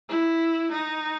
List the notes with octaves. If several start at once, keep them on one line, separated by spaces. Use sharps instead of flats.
E4
D#4